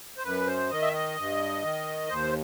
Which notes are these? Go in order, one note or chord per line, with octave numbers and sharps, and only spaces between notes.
C5
F#2 B4
C5
D#3 D#5
E5
D#5
G2
D#3
D#2 C5